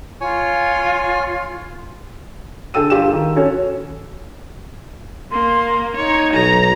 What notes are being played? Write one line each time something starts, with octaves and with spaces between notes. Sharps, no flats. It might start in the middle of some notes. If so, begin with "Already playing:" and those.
F4 C#5 G#5
D3 G#4 A4 G5 E6 D#7
G2 F4 G4 E7
D#3
C#4 F#4 A4 C#5
A#3 C6
D#4 C#5
B1 A#5